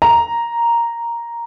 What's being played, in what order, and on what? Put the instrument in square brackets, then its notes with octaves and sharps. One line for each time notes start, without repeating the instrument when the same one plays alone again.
[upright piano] A#5